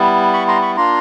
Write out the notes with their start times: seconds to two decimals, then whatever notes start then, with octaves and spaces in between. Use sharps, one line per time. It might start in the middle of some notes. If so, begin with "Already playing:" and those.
Already playing: G3 B3 E4
0.33 B5 C#6
0.48 A#5 C6
0.62 B5 C#6
0.76 A#3 D4 F4 A#5 C6